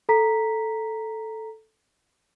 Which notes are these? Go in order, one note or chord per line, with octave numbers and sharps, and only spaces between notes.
A4 A#5 B6